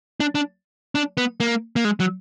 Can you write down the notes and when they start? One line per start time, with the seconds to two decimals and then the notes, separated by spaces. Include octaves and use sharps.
0.20 D4
0.35 D4
0.95 D4
1.17 B3
1.40 A#3
1.76 A#3
1.85 G#3
2.00 F#3